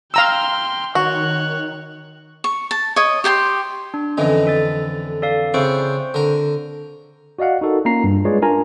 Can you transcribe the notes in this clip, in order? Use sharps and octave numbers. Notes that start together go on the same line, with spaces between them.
F5 G5 A#5 C6 E6
D#3 F#4 C#5 F#6
C#6
A5
C#5 D#5
G4 G5 G#5 C6
D4
F2 D3 E3 C#4 D#5
A4 A6
A4 D5 F5
C#3 C4 E4 C5 C#6
D3 A#4
F#4 D5 D#5 F5 F#5
D#4 F#4 A4 A#4
A#3 C#4 F4 A#5 C7
G2
G#3 F4 G#4 B4 C#5 D5
D4 F4 A#4 G#5 A#5